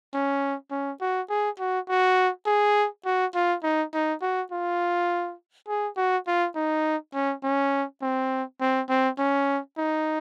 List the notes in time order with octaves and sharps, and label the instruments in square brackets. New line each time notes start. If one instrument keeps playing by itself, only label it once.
[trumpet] C#4
C#4
F#4
G#4
F#4
F#4
G#4
F#4
F4
D#4
D#4
F#4
F4
G#4
F#4
F4
D#4
C#4
C#4
C4
C4
C4
C#4
D#4